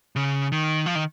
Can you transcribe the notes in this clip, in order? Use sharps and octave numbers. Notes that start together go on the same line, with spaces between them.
C#3
D#3
F3
D#3